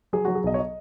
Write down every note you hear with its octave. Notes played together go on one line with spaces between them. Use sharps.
F#3 G#4
F#3 F#4
G#4
B1 D#5
C#5
D#5